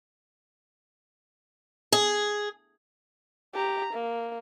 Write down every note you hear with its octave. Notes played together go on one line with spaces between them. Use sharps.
G#4
G4 A#5
A#3